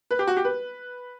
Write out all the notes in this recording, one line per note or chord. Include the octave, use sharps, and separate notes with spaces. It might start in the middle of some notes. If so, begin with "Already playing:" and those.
B4
G4
F#4
G4
B4